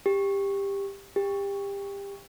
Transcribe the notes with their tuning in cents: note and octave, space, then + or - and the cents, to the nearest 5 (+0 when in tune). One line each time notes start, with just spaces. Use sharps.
G4 +15
G4 +25